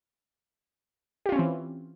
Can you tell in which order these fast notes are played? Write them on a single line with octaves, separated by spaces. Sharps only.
G4 F4 C#4 C4 E3